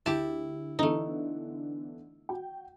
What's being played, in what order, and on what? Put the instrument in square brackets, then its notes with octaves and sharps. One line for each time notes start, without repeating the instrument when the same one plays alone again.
[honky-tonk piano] D2 [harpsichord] E4 [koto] G4 A5
[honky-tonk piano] D3 E3 B3 [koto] A3 D#4
[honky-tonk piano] F#4 G5